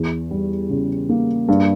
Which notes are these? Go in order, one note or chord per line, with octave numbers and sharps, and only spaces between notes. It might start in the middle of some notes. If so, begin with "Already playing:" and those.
Already playing: E2
G3
C#3
A#3
G2